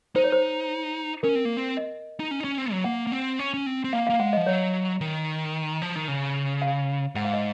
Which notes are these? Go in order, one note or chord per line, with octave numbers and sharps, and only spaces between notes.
D#4 C5
C#5
C5
C#4 A#4
C4
A#3
C4
D#5
D#4
C#4
D#4
C#4
C4
F#3
A#3 F#5
A#3
C4
C#4
C#4
C4
C4
A#3 F5
A#3 F5
G#3 F#5
F3 D#5
F#3 C#5
D#3
F3
D#3
C#3
F5
G#2 F#5
F5
D#5